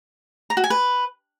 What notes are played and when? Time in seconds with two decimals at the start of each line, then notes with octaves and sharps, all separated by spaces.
0.50 A#5
0.57 F#4
0.64 G#5
0.70 B4